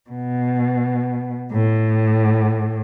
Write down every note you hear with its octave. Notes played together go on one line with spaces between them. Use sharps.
B2
A2